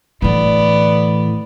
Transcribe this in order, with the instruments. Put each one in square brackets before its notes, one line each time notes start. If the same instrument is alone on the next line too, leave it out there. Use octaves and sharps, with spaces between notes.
[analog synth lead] A2 [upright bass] D3 E3 [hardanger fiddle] B3 D5